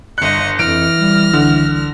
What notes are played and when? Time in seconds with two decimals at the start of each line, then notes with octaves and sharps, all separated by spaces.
0.18 G1 D#5 F#6 C#7
0.59 F2 E3 F6 A#6 D7
0.99 G3
1.33 C2 D3